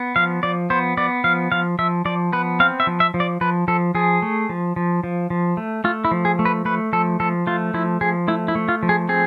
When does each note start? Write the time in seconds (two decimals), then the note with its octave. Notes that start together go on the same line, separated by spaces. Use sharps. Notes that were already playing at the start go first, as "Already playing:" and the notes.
Already playing: B3
0.16 F3 F5
0.43 F3 D5
0.70 B3 C5
0.97 B3 D5
1.24 F3 F5
1.52 F3 F5
1.79 F3 E5
2.05 F3 D5
2.33 B3 B4
2.60 C4 F5
2.80 E5
2.87 F3
3.00 E5
3.14 F3
3.20 D5
3.41 F3 B4
3.68 F3 A4
3.95 F3 G#4
4.22 A3
4.49 F3
4.76 F3
5.04 F3
5.30 F3
5.57 A3
5.84 A3 F4
6.05 E4
6.11 F3
6.25 G#4
6.39 A3
6.45 B4
6.65 A3 B4
6.93 F3 A4
7.20 F3 A4
7.47 A3 F4
7.74 F3 E4
8.01 F3 G#4
8.28 A3 E4
8.48 E4
8.55 A3
8.69 F4
8.83 F3
8.89 G#4
9.09 C4 G#4